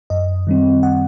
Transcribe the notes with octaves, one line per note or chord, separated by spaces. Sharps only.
F#2 D#5
D#3 G3 C4
F#5